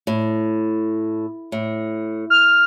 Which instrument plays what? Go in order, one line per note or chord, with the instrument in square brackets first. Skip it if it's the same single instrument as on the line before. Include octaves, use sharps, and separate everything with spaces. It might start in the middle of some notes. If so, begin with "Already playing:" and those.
[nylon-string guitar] A2
A2
[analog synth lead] F6